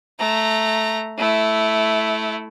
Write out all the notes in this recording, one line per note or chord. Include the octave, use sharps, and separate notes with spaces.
A3 A#5
A3 E4